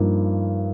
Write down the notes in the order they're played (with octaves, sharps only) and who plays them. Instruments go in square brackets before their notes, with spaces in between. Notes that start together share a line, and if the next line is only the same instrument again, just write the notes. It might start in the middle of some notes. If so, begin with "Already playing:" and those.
Already playing: [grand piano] G2 F3 A#3 D#4